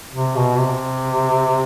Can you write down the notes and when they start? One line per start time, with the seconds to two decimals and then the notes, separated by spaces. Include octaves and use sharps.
0.14 C3
0.36 B2
0.58 C3